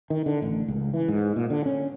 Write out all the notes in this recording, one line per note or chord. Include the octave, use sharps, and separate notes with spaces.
D#3
D3
A1
C#2
E3
G#2
A#2
D3
C#4